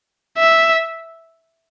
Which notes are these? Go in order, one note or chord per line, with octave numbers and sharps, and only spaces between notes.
E5